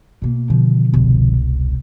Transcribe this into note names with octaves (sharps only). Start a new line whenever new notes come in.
B2 A#3
B2 D3 D#3 F3
E1 C2